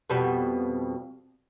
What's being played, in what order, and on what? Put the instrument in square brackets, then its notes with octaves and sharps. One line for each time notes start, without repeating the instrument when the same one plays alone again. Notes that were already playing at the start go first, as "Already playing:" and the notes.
[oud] F2 B2 G3